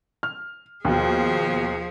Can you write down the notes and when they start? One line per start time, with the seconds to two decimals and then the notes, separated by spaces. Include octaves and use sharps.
0.23 F6
0.85 D#2 B2 F3 G#4